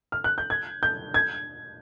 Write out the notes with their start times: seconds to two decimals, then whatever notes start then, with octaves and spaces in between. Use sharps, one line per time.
0.12 F6
0.24 F#6
0.38 G6
0.50 G#6
0.83 G6
1.14 G#6